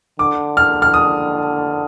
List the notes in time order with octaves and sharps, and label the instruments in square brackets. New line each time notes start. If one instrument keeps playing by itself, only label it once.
[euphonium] D3 [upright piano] D6
[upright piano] F6
F6
D#6